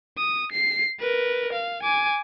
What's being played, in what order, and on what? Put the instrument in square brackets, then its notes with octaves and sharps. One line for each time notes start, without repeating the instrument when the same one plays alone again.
[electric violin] D#6
C7
A#4 B4
F5
G#5 D6